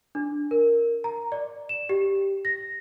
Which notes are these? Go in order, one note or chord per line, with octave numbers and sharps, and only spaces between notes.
D4
A#4
A#5
D5
E7
G4
A#6